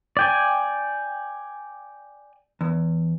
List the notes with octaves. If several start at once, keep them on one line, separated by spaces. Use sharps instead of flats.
D5 G5 G#5
E2